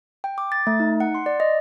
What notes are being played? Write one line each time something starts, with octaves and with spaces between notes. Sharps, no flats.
G5
D6
A6
A3
D#4
F#5
C6
D5
D#5